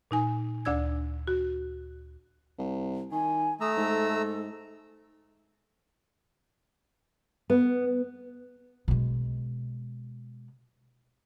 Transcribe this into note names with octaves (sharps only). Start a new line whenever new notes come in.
A#2 D#4 G#5
D2 D4 D5 E6 G#6
F#4
C2
D#3 G#5
A3 A#5 D#6 E6
G#2 A4
B3
B2 G#3